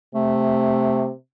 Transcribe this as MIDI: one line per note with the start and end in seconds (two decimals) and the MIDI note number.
0.15 1.12 48
0.15 1.09 57